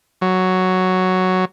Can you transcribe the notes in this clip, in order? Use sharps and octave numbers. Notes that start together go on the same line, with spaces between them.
F#3